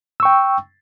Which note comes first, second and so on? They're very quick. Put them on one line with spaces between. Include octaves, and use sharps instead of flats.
E6 C#6 G5